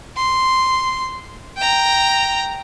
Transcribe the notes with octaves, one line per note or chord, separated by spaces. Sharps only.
C6
G5 A#5